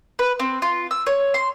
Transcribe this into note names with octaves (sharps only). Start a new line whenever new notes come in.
B4
C4
F4
E6
C#5
C6